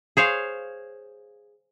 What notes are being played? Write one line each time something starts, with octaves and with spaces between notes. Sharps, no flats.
G#4 C5 C#5 F5